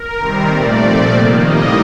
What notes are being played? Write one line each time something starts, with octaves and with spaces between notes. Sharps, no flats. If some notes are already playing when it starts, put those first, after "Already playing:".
Already playing: A#4
C3 D#3 G3 C4
A#2 A3 C4 D5
A#2 F3 A3 C4
C3 D#3 A#3
A2 G3 A#3 D#5